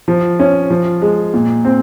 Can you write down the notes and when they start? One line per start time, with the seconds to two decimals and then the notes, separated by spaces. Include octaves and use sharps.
0.08 F3
0.40 C#4
0.70 F3
1.02 G#3
1.34 A#2
1.65 C4